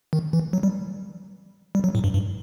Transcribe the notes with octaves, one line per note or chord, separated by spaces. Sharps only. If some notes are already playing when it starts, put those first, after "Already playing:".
D#3
E3
F#3
G3
G3
F#3
A2
G2
G2